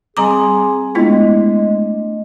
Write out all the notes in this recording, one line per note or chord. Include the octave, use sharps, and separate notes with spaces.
G3 C4 G#4 G#5 A#5 C6 D6
G#3 A3 B3 D4 E4 F4 D#5